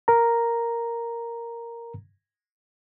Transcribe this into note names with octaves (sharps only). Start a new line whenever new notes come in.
A#4 A#5